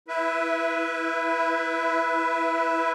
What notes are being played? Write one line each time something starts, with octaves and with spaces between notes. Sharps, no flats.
E4 B4 E5